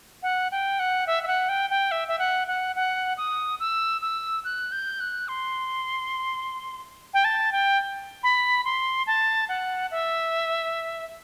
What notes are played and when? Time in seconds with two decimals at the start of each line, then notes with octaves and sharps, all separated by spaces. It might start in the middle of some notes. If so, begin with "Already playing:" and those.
0.23 F#5
0.51 G5
0.80 F#5
1.07 E5
1.23 E5
1.27 F#5
1.49 G5
1.70 G5
1.91 E5
2.08 E5
2.19 F#5
2.48 F#5
2.76 F#5
3.17 D#6
3.60 E6
4.02 E6
4.44 F#6
4.72 G6
5.00 F#6
5.28 C6
7.14 G5
7.25 A5
7.52 G5
8.23 B5
8.65 C6
9.07 A5
9.49 F#5
9.91 E5